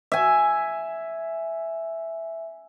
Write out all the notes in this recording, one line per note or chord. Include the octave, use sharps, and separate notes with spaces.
E5 G#5